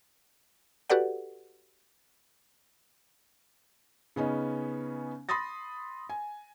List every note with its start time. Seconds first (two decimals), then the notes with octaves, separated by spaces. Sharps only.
0.90 F#4 G4 A4 B4 D5 F#5
4.16 C#3 B3 C#4 D#4
5.29 B5 C6 D#6 A6 A#6
6.09 G#5